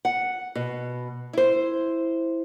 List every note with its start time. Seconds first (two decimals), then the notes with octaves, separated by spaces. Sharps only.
0.05 F#5
0.55 B2
1.33 E4 C5